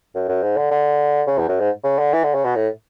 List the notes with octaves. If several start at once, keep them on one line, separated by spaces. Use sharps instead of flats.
F#2
F#2
G#2
D3
D3
C#3
E2
F#2
G#2
C#3
D3
E3
D3
C#3
B2
A2